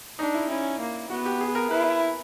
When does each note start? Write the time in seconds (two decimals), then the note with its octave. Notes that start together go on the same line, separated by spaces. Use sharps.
0.19 D4 D#4
0.34 E4
0.49 C#4 E4
0.80 A#3
1.10 B3 F#4
1.26 G4
1.41 G#4
1.55 A#4
1.71 E4 B4